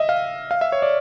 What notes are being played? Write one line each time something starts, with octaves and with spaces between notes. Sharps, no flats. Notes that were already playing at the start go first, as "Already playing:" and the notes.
Already playing: D#5 E5
F5
F5
E5
C#5
D5